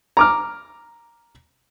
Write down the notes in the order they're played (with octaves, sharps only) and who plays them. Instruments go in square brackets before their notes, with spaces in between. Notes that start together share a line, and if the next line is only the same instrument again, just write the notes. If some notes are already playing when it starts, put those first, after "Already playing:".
[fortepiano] A#5 D6 F6